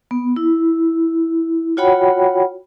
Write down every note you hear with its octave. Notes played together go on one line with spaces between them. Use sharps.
B3
E4
F4 F#4 C#5 F#5 G5 B5